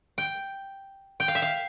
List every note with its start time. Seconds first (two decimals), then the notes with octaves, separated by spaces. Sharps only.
0.18 G5
1.20 G5
1.28 F5
1.35 E5
1.42 F5